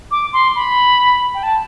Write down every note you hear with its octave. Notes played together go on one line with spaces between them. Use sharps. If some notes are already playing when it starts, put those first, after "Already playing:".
D6
C6
B5
G5
A5